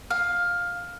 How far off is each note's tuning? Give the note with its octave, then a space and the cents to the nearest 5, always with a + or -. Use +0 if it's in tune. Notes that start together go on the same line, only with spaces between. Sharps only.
F5 +10